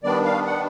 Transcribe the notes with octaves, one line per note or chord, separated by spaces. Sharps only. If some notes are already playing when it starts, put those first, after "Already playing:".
D#3 G3 B3 D4 D5
F5
F#5